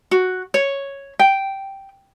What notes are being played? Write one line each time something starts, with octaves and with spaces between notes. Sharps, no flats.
F#4
C#5
G5